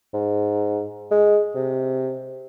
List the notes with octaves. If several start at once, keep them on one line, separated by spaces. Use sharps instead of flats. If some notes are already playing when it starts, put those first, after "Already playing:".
G#2
G#3
C3